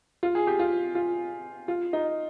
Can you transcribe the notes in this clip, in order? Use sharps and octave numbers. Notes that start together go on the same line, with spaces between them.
F4
G#4
G4
F4
F4
F4
D#4